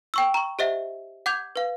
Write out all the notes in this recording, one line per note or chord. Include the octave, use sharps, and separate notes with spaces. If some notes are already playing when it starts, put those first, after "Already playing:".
G5 C#6 E6
A#5 C#6
G4 C5 D#5 E5 F#5
F#5 D6 G6 G#6 F7
B4 F5